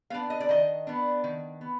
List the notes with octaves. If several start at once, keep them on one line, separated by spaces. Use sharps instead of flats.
B3 D4 F5
D#5
D5
D#3 D#5
B3 D4
D#3
B3